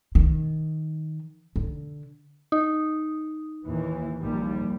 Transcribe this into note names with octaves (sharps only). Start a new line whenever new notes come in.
D#3
D3
D#4
D#2 A#2 E3
A#1 D#2 G3